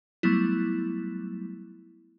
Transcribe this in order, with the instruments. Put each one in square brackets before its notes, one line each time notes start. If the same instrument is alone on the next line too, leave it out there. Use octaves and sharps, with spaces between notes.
[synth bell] F#3 G3 A3 B3 E4